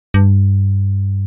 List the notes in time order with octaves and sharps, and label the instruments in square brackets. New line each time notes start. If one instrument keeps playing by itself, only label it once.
[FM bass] G2